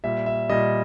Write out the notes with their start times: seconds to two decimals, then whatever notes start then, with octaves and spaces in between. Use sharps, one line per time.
0.04 A#2 G3 E5
0.26 E5
0.49 A#2 G3 D#5